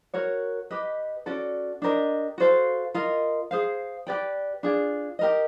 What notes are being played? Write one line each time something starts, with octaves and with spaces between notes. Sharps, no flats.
F#4 A#4 C#5
G4 B4 D#5
C#4 F#4 A4 D5
D4 G4 A#4 D#5
F#4 A4 C5 F5
F4 A#4 D#5
G#4 C5 F5
G4 B4 D5 G5
D4 F4 G#4
G4 A#4 D#5